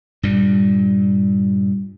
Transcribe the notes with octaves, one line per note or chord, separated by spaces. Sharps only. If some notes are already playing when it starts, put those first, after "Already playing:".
G2 A#2 G3